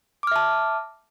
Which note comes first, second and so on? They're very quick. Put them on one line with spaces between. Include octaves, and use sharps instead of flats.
D6 F6 E5 A5